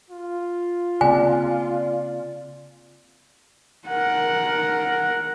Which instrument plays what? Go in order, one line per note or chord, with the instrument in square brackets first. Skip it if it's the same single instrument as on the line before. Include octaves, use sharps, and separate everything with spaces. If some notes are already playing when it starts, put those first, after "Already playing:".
[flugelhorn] F4
[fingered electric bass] C#3 A#3 C4 [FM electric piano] D5 [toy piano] G#5
[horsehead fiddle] A#4 F#5